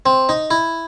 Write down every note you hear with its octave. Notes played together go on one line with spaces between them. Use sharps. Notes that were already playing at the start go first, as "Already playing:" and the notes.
C4
D#4
E4